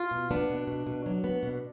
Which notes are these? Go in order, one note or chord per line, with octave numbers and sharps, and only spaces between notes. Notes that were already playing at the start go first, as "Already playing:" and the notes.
Already playing: F4
B2
B3 D4
B2
B2
B2
F#3
B3
B2